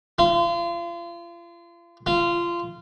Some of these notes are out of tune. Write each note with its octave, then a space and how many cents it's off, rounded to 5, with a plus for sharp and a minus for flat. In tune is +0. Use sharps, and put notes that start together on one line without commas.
F4 -35
F4 -20